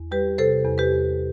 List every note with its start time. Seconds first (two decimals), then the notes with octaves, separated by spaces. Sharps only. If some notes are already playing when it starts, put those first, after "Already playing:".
Already playing: E2
0.11 G3 G4 B4
0.38 C3 A4 C5
0.65 E2
0.78 G4 B4
0.92 E2